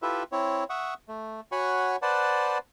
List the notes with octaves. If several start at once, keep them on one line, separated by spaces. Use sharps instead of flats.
E4 F4 G4 A4 B4 E5
C4 E4 C#5
E5 F#5 C#6 D#6
A3
F#4 C#5 F#5 G#5 B5 C#6
B4 C5 D5 F#5 A5